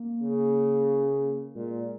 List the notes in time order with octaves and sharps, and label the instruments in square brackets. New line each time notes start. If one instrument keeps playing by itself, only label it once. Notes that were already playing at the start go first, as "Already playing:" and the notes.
Already playing: [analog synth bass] A#3
[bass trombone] C#3
[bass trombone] A#2 [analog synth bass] G#3